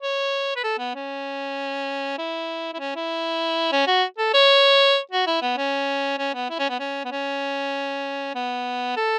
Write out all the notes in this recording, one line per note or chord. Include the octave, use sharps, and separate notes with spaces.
C#5
B4
A4
B3
C#4
E4
E4
C#4
E4
C#4
F#4
A4
C#5
F#4
E4
B3
C#4
C#4
B3
E4
C#4
B3
C#4
B3
C#4
B3
A4